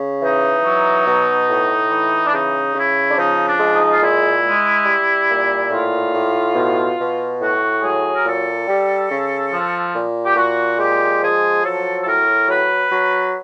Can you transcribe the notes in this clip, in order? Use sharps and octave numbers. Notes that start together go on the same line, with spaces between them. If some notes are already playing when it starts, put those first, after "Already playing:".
Already playing: C#3
E3 D#4
F#3
B2
A2
E3
D4
C#3 D#4
C#3 E4
D4
F3 D#4
D4
G#3
D#4
F4
A#2 E4
G#3
G3
A#2
A2 F4
A2
B2
B2
A2 F#4
F#3 G#4
A#4
A#2 A4
G3
C#3
F3
A#2
G4
A#2 F#4
G#3 G4
F3 G#4
F#3 A4
A4
A2 A#4
F#3 B4
F#3